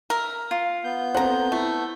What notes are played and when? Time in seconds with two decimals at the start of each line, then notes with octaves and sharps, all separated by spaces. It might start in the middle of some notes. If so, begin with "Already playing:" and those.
0.10 A#4 E5
0.51 F4
0.84 B3 G6
1.14 C4 A4 C5 F#5 A#5
1.52 A3 E4